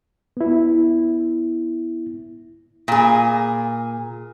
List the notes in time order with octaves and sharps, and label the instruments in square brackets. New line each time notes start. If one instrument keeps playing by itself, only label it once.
[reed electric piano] B3 E4
[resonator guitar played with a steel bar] A#2 G#4